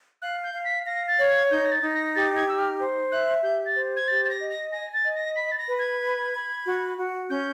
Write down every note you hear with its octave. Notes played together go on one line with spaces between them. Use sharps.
F5 F#6
G6
F5
B6
F5 A#6
A6
C#5
G#6
D#4 G6
A#6
A6
D#4
A#6
G4 A6
G#6
D#4 E6
F6
C5
E5 F#6
G4 G6
A6
C5
G#6
G4 A6
A6
A#6
D#5
A#6
G#5 A#6
A6
D#5
A#6
B5 B6
A6
A#6
B4
G#6
B5
B5
F#4
F#4
C#4 G6